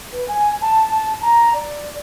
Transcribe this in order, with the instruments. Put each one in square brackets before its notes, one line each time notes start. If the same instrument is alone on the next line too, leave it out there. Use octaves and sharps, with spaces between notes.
[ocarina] B4
G#5
A5
A5
A#5
D5